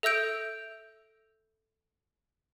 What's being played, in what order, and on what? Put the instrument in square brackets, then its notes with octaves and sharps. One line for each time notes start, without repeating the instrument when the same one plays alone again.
[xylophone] A4 E5 E6 G6 D7